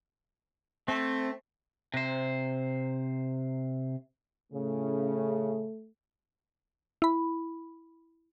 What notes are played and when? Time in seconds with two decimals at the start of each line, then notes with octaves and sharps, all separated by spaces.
0.88 A3 C4
1.94 C3 C5
4.52 A2 C#3 A3
7.02 E4 B5